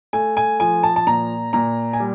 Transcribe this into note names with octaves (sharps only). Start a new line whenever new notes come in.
A3 G#5
G#5
F3 G#5
A5
A5
A#2 A#5
A#2 A#5
G#5
G3